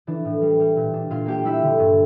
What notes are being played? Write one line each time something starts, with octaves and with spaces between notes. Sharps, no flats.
E3 D4 D5
A2
G3
G3
A#2
D4
A#2 F4 F5
A#3 G4 G5
G3 E4 E5
D3
G2